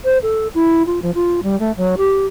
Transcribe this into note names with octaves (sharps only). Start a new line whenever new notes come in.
C5
A4
E4
F4
F3
F4
G3
A3
F#3
G4